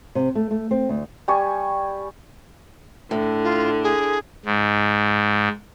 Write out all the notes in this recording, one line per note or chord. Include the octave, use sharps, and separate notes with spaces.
C3
A3
A3
C4
D2
G3 G#5 C#6
A2 D3
F4
G#4
G#2